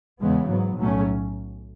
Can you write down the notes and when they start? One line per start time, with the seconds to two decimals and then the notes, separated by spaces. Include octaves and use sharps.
0.20 E2 C#3 E3 G#3 B3
0.48 G#2 F#3 B3
0.77 B1 A2 F#3 A3 C#4